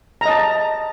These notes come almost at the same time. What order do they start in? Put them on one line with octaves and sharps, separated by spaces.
A#5 D#5 A5